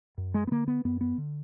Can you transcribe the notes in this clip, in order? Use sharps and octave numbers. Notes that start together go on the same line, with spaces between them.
F#2
G#3
B3
D3 A#3
B3
F#2 B3
B3
D3